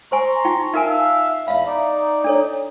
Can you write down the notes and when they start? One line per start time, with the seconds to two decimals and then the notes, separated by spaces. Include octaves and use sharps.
0.12 C5 G#5 A#5 C6 C#6
0.45 D#4 F4 G5
0.74 D#4 A#4 E5 F5 G#5
1.48 E2 E5 F5 B5
1.67 D#4 D5
2.24 D4 A4 C#5